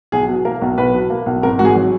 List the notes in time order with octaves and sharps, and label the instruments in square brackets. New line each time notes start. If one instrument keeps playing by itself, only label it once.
[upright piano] B1 G#4
B2
A#3 A#4
B1
B1 B4
B2
A#3
B1
G#1 A#4
G#2 F#4
G#4
F#3